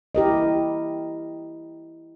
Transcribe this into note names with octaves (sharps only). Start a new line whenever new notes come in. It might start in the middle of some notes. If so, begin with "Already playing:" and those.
E4 G4 A#4 D#5